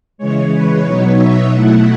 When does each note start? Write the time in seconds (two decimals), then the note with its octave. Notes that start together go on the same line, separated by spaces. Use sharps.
0.18 C#3 E3 G#3 C#5
0.50 B4
0.83 B2 F#3 B3 D#4 C#5
1.17 E5
1.49 B2 F#3 A3 E4 F#5